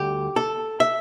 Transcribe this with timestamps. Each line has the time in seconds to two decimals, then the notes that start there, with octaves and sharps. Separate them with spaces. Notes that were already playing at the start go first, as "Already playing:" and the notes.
Already playing: D2 D3 G3 G4
0.36 A4
0.80 E5